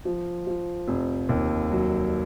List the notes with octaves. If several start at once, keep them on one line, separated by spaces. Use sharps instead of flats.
F3
F3
F1
D#2
F#3